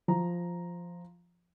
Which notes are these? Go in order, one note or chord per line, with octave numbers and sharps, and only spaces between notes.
F3 A#5